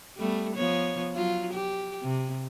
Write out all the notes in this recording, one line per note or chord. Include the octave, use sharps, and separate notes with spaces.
G3 A3 B3
F3 B3 C#5
F#3 F4
G4
C3